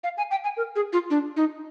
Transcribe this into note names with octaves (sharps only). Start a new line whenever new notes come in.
F5
G#5
G5
G#5
A#4
G#4
F4
D4
D#4